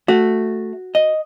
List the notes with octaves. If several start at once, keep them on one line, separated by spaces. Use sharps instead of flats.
A3 F#4
D#5